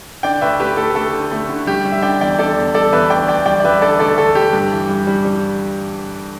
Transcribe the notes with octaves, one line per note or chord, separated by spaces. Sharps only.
D3 D5 G5
D2 B4 E5
A3 G4 B4
A3 A4
D2 A4
D3
A3
D3
G3 G4
G3
E5
D3 D5 G5
E2 D5 G5
D3 A4 D5
E2
G3 A4 D5
E2 B4 E5
D2 D5 G5
D2 D5 G5
G3 D5 G5
D5
G3 B4 E5
D3 A4 D5
D2 A4 D5
D2 A4
D2 G4
G2
E3
G3
G3
G3